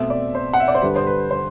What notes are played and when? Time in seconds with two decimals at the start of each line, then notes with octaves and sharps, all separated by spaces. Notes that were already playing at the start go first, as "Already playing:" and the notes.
Already playing: B2 A3 C4 E5
0.10 D5
0.35 C5
0.53 F#5
0.60 E5
0.68 D5
0.75 C5
0.82 G2 D3 G3 B4
0.96 C5
1.07 B4
1.31 C5